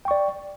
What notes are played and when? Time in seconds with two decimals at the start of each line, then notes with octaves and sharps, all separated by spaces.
0.05 G5
0.08 C#6
0.11 D5